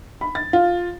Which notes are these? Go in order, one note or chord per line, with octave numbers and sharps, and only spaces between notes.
B5
A6
F4